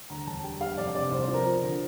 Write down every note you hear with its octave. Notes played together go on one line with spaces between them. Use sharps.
D2 A#5
E1 A5
G3 G5
G3 F5
F1 D5
C3 D5
C2 C5
C5
F3
A#4
F3
D3